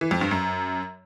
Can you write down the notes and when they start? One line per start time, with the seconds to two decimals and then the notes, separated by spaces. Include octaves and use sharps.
0.01 E3
0.11 F2
0.21 G2
0.31 F#2